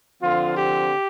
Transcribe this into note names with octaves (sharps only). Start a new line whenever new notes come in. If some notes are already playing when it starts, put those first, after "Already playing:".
D3 F3 C4 F4
G4